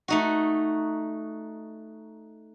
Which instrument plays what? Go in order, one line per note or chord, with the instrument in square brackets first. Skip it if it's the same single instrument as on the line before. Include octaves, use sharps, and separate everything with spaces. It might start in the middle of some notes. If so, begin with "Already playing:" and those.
[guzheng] A3 D#4 F#4